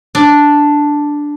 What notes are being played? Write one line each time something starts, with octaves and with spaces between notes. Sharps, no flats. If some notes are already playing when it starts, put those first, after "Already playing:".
D4